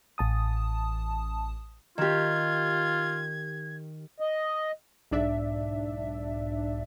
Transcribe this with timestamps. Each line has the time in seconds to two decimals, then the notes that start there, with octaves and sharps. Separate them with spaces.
0.18 A1 A5 D#6
1.98 D#3 F4 G4 G#6
4.20 D#5
5.11 B1 G#2 D4 D5 E5